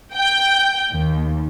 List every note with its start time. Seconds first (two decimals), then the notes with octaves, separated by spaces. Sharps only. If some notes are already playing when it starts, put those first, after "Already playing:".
0.14 G5
0.91 D#2